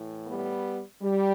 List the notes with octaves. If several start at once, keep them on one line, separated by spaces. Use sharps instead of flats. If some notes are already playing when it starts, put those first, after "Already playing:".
Already playing: A2 E3
G3 B3
G3